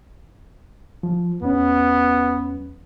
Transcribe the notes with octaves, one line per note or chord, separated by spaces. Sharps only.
F3
E2 B3 C#4